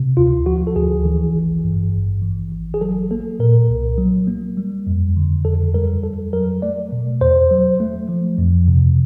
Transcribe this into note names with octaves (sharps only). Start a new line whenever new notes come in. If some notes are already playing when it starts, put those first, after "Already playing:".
Already playing: C3
D2 F4
F3 F#4
A4
D2 G#4
E3
G#1
G2
G#1
E3
G#1
G#4
F#3 A4
A#3 A4
A#2 A#4
C2
F#3
A#3
G3
F2
D3
F2 A4
G3 A#4
F2 A4
F#3 A#4
A3 D5
B2
E2 C5
F#3
A3
F3
F2
C3